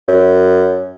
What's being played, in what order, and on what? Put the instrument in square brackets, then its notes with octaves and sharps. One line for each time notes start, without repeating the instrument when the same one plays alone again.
[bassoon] F#2